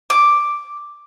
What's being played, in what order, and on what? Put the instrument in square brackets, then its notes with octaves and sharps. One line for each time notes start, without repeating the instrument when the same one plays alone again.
[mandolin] D6